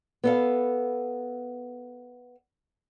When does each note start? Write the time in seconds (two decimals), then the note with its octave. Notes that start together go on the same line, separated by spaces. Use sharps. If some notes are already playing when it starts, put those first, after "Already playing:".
0.24 B3 A4 F5